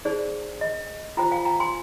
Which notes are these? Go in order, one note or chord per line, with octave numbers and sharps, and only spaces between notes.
D#4 G#4 C5 D5
D#5
F4 C5 G5 A#5
F5 G#5
G5 A#5
G#5 C6